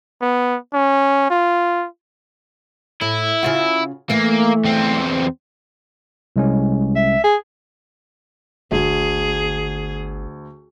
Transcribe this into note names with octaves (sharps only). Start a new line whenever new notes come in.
B3
C#4
F4
A2 E4
C#3 F4 F#4
E3 A3 A#3
E2 C4
C2 G#3 C#4
E5
G#4
G1 D2 G#4